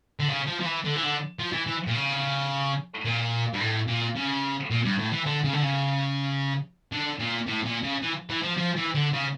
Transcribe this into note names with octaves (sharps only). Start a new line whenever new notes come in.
D3
C#3
F3
F3
E3
D3
E3
D3
F3
E3
E3
A#2
C#3
A#2
G2
A2
A#2
C#3
A#2
G2
A2
E3
D3
C#3
D3
C#3
D3
A#2
A2
A#2
C#3
E3
E3
F3
F3
E3
D3
C#3